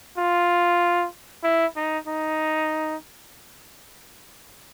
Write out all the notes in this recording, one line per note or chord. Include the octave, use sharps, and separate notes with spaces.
F4
E4
D#4
D#4